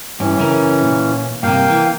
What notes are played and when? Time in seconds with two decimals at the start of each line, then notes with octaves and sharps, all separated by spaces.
0.20 G2 E3 C#4
0.37 F#2 C#3 A#4
0.82 A#2
1.43 G2 C3 A#3 F5 G5
1.70 E3